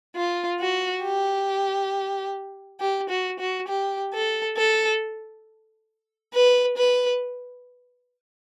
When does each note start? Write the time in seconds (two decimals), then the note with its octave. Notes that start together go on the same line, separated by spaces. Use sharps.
0.16 F4
0.60 F#4
1.04 G4
2.80 G4
3.09 F#4
3.39 F#4
3.68 G4
4.14 A4
4.57 A4
6.34 B4
6.77 B4